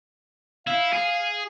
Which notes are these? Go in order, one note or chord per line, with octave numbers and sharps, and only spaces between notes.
E4 F5
G#4